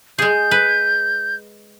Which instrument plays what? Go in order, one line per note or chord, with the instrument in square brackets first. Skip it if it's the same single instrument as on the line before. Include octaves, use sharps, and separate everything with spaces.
[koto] G#3 G#4 [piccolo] G6
[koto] B4